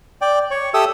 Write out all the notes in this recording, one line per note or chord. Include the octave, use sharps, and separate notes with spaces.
D5 G5
C#5
G4 A4 E5 D#6 E6